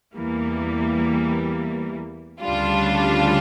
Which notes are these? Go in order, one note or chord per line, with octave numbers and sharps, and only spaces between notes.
E2 E3 G3 A#3
D2 C#3 G3 D4 F4